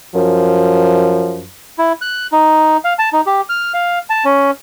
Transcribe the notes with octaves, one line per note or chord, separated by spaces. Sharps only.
F#2 F3
E4
F#6
D#4
F5
A5
D#4
G4
F6
F5
A5
C#4